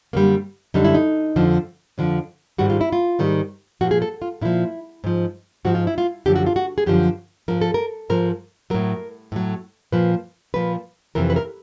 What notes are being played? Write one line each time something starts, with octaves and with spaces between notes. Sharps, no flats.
F#2 D3 G3 A#3
F#2 D3 G3 D#4
E4
D#4
F2 D3 F3
F2 D3 F3
G#2 D#3 G3 F#4
F4
E4
F4
G#2 D#3 G3
A#2 F3 F#4
G#4
A4
F4
A#2 F3 E4
G#2 F3
G#2 F3 F#4
F4
E4
F4
F#2 D3 F3 G4
F#4
F4
F#4
G#4
F#2 D3 F3 G4
G#2 F3 A#4
A4
A#4
G#2 F3 A#4
A2 F#3 A#4
A2 F#3
A#2 F3 B4
A#2 F3 B4
F2 C3 E3 A#4
B4
A#4